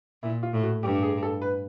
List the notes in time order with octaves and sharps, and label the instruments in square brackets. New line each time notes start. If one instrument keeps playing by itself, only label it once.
[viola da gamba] A#2 [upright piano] E4
[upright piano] F4
[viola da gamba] A2
[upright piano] F#4
[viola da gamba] G2 [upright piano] G4
[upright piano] G#4
A4
B4